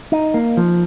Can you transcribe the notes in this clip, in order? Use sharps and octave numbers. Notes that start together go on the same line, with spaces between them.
D#4
A#3
F3